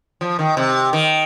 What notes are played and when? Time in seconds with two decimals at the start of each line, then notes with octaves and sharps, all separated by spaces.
0.21 F3
0.39 D#3
0.57 C3
0.93 D#3